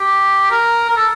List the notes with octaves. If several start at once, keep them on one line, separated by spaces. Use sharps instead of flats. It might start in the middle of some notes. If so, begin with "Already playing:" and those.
Already playing: G4
A#4
A#4
A4